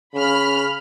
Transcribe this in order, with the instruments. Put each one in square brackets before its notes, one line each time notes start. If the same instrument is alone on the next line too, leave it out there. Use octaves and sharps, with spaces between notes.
[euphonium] C#3 [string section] B5 F6